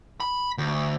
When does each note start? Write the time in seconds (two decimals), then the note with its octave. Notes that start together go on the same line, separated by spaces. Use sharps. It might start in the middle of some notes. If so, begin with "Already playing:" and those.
0.20 B5
0.58 D2